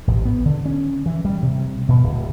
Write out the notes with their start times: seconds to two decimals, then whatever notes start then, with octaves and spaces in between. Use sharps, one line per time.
0.07 A1
0.25 B3
0.45 D3
0.66 C#4
1.06 E3
1.25 G3
1.42 C3
1.89 B2
2.04 D1